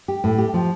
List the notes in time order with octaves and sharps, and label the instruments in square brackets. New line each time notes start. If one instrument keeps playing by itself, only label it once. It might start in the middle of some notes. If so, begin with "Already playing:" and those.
[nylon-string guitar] G4
A2
G4
F3